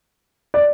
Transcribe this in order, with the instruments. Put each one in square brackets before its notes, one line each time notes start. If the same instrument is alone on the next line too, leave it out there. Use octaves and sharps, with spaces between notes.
[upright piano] D5